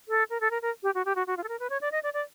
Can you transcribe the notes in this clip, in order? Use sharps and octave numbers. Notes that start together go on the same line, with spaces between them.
A4
A#4
A4
A#4
A#4
G4
F#4
G4
F#4
F#4
F4
A4
A#4
B4
C#5
D5
D#5
D5
D5